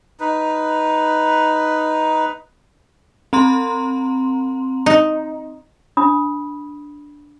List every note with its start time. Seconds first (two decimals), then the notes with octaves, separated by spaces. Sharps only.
0.20 D#4 B4
3.33 C4 A#5 C6
4.86 D#4
5.97 D4 B5 D#6